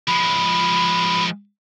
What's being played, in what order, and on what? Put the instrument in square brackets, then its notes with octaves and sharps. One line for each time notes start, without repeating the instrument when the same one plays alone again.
[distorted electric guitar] F3 G#3 [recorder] B5